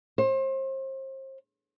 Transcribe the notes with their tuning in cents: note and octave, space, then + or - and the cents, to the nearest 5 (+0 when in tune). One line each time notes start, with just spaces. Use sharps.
C5 +35